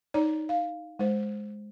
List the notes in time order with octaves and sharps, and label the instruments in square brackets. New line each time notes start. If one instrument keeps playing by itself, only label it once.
[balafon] D#4 C#5 D5 A#5
F5
G#3 C5